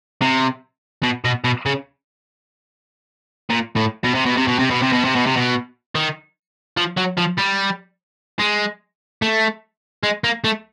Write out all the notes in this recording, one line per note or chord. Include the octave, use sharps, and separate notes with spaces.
C3
B2
B2
B2
C#3
A#2
A2
B2
C3
B2
C3
B2
C3
B2
C3
B2
C3
B2
C3
B2
D#3
F3
F#3
F3
G3
G#3
A3
G#3
A#3
A3